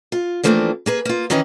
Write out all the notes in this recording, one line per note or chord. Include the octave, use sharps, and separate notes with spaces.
F4
E3 F3 A3 A#3 C4 D4
A#3 G#4 B4
A#3 F4
D#3 E3 C#4 D#4 E4